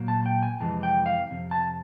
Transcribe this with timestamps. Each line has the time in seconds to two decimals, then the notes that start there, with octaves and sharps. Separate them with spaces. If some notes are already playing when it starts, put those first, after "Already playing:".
Already playing: A#2 F#3 A#3
0.08 A5
0.26 G5
0.43 G#5
0.60 F2 C3 E3 G#3 A5
0.83 G5
1.06 F5
1.31 F2 C3
1.51 A5